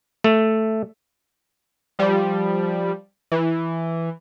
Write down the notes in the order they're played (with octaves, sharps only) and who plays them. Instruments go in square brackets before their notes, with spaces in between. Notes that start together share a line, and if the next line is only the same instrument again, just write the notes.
[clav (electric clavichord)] A3
[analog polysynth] F3 G3
E3